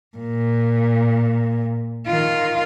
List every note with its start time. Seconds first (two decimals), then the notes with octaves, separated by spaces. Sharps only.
0.17 A#2
2.07 D#3 F4